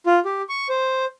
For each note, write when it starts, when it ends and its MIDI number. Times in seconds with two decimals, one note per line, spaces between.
0.06 0.20 65
0.25 0.42 67
0.49 0.68 85
0.69 1.05 72